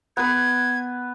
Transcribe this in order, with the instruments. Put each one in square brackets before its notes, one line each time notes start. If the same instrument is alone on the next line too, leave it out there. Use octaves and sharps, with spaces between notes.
[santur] B3 B4 [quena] G#6